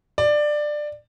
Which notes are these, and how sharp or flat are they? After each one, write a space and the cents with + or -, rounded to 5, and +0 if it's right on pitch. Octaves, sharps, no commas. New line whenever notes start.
D5 +15